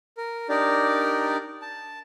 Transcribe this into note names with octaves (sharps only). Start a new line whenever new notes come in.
A#4
D4 D#4 G4 A#4 D5
A5